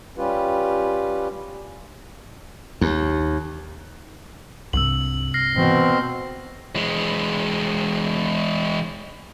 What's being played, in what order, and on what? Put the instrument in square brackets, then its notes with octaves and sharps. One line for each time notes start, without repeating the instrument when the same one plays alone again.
[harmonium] G3 C#4 F4 G4 B4
[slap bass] D#2
[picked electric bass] C2 [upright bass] G2 C3 [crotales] E6 F#7
[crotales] F6 A#6 C7
[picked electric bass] G#2 E3 [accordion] B2 C4
[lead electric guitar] E3 G#3